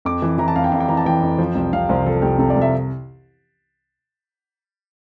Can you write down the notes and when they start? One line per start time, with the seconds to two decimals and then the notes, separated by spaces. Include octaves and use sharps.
0.05 F2 D6
0.22 E3
0.38 E3 A#5
0.48 A5
0.56 F2 F5
0.64 G5
0.72 F2 F5
0.80 G5
0.88 E3 A#5
0.97 A5
1.06 E3 G5
1.22 F2
1.38 F3
1.55 C2
1.73 C3 F5
1.89 C2 C5
2.06 F3 A4
2.22 C2 G4
2.39 C3 A4
2.50 D5
2.56 C2
2.62 E5